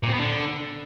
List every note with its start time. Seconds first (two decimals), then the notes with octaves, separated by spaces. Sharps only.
0.03 A#2
0.08 C4
0.13 B3
0.19 D3